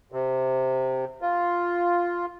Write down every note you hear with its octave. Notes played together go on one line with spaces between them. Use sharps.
C3
F4